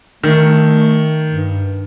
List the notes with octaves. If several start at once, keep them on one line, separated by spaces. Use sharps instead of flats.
D#3 A3
G2